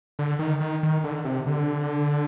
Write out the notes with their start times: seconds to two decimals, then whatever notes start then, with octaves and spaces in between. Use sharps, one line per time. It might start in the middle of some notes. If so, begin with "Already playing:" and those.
0.19 D3
0.39 D#3
0.60 D#3
0.83 D#3
1.04 D3
1.25 C3
1.46 D3